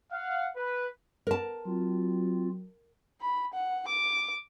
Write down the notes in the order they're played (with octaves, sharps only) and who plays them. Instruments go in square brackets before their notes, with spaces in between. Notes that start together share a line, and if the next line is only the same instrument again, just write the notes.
[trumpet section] F5 F#5
B4
[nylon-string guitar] A#4 A5
[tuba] F#3 [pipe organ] C4 F4
[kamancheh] B5
F#5
D6